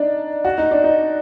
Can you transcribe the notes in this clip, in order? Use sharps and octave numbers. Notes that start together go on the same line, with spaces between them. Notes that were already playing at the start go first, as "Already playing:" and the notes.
Already playing: D4 D#4
F#4
D#4
D4
D#4